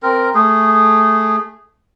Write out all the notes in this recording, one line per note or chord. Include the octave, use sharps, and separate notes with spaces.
C4 A#4
A3 G#4